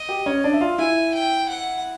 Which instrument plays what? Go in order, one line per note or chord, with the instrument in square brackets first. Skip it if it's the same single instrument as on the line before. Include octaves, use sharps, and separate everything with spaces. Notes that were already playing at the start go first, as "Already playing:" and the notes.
Already playing: [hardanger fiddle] D#5
[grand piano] G4
C#4 C#5
D4 D5
E5
F4 F5
[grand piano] E4 E5 [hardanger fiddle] G#5
[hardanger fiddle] G5
F#5